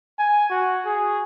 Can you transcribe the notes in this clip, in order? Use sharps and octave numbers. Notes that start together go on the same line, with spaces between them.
G#5
F#4
G#4